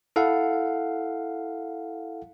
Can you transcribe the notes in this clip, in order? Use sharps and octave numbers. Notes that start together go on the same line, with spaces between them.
E4 A4 F5 F#5